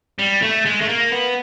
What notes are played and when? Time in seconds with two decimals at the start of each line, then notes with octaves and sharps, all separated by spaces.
0.19 G3
0.42 A3
0.65 G#3
0.81 A3
0.88 A#3
1.12 B3